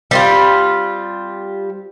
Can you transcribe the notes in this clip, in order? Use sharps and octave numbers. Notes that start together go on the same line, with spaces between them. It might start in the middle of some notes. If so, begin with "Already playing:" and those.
G3 C4 F4